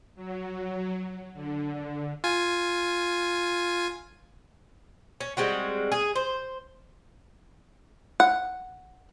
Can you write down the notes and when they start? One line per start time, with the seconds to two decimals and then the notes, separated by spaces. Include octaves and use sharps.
0.16 F#3
1.34 D3
2.24 F4 G#5
5.21 C#4
5.37 G3 G#3 C4 F#4
5.92 G#4
6.15 C5
8.20 F#5